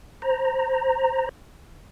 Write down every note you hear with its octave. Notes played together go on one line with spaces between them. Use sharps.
C5 A#5